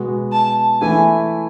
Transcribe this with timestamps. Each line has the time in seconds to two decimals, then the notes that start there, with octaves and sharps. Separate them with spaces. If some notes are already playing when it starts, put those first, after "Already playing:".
Already playing: B2 G#3 B3 F#4
0.33 A5
0.82 E3 A3 E4 G#5